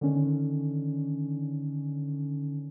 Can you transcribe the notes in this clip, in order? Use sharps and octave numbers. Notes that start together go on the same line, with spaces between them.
D3 D#3 C#4